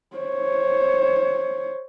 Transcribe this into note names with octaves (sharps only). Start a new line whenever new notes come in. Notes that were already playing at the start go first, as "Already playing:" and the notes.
C5 C#5